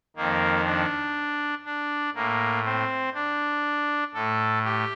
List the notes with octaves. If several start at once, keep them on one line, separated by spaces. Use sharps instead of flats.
F2 D#3 A#3
D4
D4
A2 A#3
C4
D4
A2 A4
G4